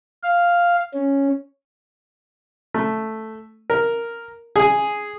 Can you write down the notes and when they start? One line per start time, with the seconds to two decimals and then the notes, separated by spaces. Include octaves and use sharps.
0.23 F5
0.94 C#4
2.74 A3
3.70 A#4
4.56 G#4